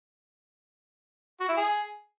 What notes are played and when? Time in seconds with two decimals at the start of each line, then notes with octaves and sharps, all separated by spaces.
1.40 F#4
1.48 E4
1.57 G#4